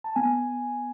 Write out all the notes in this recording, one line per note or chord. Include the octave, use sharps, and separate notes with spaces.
A5
B3 G#5